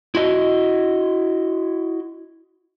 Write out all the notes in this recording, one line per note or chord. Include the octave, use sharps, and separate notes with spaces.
E4 F#4 D#5